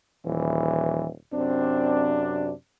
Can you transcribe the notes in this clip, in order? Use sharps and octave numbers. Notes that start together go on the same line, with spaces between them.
D#1 E3
F#2 C3 C4 D4